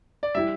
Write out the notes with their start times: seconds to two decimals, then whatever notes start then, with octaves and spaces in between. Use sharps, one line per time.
0.23 D5
0.35 G3 E4 G4 E5